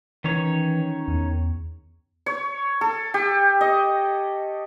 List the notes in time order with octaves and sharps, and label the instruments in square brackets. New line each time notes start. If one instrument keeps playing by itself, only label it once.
[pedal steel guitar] D#3 C#4 C#5 [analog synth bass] E3
[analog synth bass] E2
[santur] C#5
A4
G4
D#5